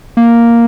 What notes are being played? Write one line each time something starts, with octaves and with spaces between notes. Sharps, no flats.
A#3